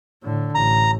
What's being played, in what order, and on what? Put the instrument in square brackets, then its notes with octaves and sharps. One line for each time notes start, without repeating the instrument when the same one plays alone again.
[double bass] A2 D3
[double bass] A1 [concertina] A#5